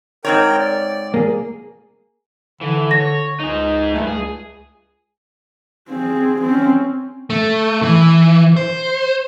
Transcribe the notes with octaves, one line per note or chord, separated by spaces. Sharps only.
G#2 C4 A#4 C#5 G5
D5
A#3 G#4
D3 E3
C#5 A#6
C#2 D#4 G#4
G2 A3
C#2 G#4
C4 G#4
C4 C#4
A3
E3
C5